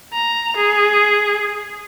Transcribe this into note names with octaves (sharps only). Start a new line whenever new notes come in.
A#5
G#4